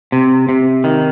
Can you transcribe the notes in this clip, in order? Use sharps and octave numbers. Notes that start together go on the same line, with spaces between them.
C3
C3
D#3